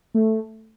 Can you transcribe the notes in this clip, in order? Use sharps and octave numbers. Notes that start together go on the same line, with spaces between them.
A3